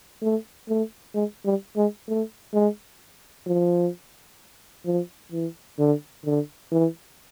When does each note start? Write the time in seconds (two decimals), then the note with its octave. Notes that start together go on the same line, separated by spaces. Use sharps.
0.22 A3
0.69 A3
1.15 G#3
1.45 G3
1.77 G#3
2.08 A3
2.54 G#3
3.46 F3
4.86 F3
5.32 E3
5.79 D3
6.25 D3
6.72 E3